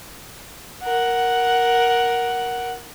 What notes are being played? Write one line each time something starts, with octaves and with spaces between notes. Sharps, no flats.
A#4 F#5